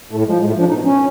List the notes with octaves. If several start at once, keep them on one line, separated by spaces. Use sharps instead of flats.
A2 A3
F3 G#3
A2 G#3
A3
F3
D4
B2 D#4
C#4